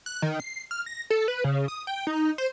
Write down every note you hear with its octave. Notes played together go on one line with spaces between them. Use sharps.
F#6
D#3
C7
F6
A#6
A4
B4
C#3
D#6
G5
D#4
C5